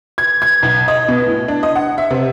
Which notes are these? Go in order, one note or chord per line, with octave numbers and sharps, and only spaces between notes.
G#6
G#6
B1
D#5
B2
A2
D4
D#5
F#5
E5
C3